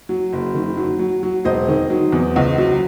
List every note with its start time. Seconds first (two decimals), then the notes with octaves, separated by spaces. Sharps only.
0.09 F#3
0.33 F#1
0.54 D#3
0.77 F#3
0.99 F#3
1.23 F#3
1.45 E1 C5 D#5
1.68 D#3
1.90 F#3
2.12 E2
2.36 C#2
2.58 F#3